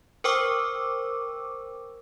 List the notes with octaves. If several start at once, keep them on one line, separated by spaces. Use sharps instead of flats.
A#4 C5 G5 C#6 D6 E6